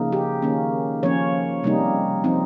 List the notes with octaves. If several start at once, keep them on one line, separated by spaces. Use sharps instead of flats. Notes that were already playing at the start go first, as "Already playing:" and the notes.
Already playing: C#3 F3 A#3 D#4
G4
D#3 A#3 C#4
F3 A#3 C#4 C#5
C3 G3 A#3 D#4
F3 C4 D#4